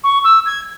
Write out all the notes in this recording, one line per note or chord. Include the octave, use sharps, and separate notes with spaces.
C#6
E6
G#6